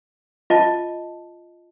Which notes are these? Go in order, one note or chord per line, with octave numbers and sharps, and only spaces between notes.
F4 D#5 A5